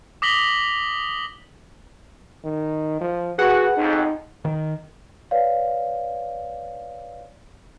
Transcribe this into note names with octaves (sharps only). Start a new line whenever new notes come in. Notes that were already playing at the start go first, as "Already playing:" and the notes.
D6 D#6 A#6 B6 F#7 G7
D#3
F3
F#4 G#4 B4 F#5
B1 F2 D#4
D#3
B4 C#5 D5 F5